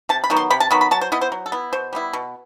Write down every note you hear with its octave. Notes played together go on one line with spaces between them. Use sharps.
C3 A5
B5
D#3 F#3 B3
C6
C3 B5
A5
D#3 F#3 B3 B5
B5
F#3 A5
C5
B3 E4 D#5
C5
F#3
A4
B3 E4
B2 C5
G3 B3 E4
B2